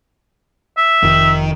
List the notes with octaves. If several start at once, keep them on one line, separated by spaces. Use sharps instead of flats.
E5
F1 D#3